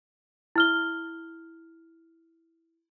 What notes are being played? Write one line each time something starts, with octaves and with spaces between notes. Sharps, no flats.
E4 F6 G7